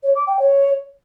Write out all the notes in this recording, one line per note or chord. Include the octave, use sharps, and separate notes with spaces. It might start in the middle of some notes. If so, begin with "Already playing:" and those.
C#5
D6
G5
C#5